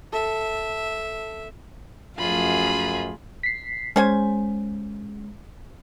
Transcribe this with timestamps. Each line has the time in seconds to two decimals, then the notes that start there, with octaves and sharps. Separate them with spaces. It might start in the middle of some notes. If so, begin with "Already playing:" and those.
0.13 A4 E5
2.18 F#2 F3 A3 F4 G#4 B5
3.43 B6 C7
3.96 G#3 C#4 C5 G#5